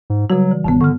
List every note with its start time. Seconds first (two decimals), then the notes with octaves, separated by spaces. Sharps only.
0.10 G#2
0.30 C#3 F#3 G3 F#4
0.51 E3
0.64 E1 G2 D#3 B3
0.81 D3 C#6 F6